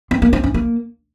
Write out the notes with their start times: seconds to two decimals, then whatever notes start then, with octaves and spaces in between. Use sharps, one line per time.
0.11 C4
0.22 A#3
0.33 C4
0.44 C#4
0.54 A#3